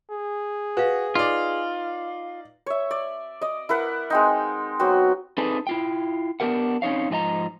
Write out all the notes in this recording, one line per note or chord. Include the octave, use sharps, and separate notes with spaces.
G#4
F#4 B4 F5
D#4 F4 D5
C#5 E5
D5
D5 D#5
E4 A#4 B4 F#5
G#3 C4 D#4
F#3 B3 C4 F#4
C4 D4 D#4 G#4 A4 B4
E4 F4 G5
B3 D4 G4 A#4 F#5
C4 C#4 D#4 C#5 F5
G#2 F3 G#4 D#5 A#5